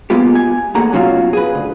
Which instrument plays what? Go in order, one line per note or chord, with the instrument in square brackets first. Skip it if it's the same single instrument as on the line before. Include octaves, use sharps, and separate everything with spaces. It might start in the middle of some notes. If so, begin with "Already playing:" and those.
[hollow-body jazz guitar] G#3 A#3 B3 F4 G4
G#5
E2 A3 A#3 G#4 F#5 A#5
B1 F#3 C#4 F4 F#4 F5
G#4 B4
D2